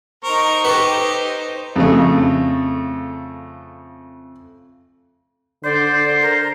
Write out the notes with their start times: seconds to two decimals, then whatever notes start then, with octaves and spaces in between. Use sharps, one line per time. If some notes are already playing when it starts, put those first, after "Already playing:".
0.24 D#4 A#4 C5 C#6
0.65 G4 A4 B4
1.76 F2 C#3 A3
5.64 D3 C5 D5
6.21 A#4